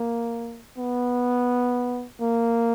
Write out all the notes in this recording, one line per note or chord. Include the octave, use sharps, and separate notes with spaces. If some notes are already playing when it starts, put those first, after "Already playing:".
Already playing: A#3
B3
A#3